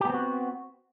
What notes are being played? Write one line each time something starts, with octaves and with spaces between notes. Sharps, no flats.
B3 C4 F#4 G4